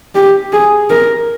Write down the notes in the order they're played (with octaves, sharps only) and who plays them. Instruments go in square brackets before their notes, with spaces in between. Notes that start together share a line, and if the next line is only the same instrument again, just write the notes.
[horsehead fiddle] G4
G#4
A#4